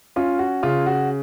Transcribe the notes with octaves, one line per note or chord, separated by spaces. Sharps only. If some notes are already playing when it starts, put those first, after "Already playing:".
C#4 F4
F#4
C#3 F4
F#4